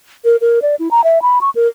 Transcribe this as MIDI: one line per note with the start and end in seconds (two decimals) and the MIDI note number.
0.25 0.37 70
0.41 0.59 70
0.62 0.75 74
0.79 0.88 64
0.91 1.04 82
1.04 1.22 76
1.22 1.39 83
1.41 1.50 85
1.55 1.68 70